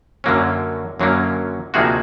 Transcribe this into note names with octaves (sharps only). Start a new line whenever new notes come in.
F#2 D3 F#3 A#3 C#4
F#2 D3 F#3 A#3 C#4
D2 C3 F3 A#3 D#4 F#4 G#4